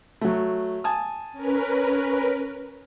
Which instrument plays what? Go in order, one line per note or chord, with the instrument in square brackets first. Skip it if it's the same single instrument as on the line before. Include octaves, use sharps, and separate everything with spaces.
[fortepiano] F#3 A3
G#5 A5 D#6
[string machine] C#4 A#4 B4